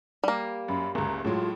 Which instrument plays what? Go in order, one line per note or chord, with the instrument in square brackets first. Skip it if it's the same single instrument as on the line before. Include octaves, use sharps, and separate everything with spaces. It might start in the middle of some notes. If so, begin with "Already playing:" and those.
[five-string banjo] G3 A#3
[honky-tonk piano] F#2 [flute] B5
[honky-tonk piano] F#1 C#2 [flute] A#5
[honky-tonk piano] A2 F#3 G#3 [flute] F4